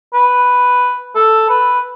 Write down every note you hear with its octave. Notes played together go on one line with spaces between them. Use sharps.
B4
A4
B4